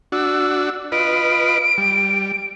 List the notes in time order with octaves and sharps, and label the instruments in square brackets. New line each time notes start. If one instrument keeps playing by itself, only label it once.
[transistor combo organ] D4 F#4 [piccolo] E6
[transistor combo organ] F4 B4 D#5 [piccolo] D7
[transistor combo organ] G3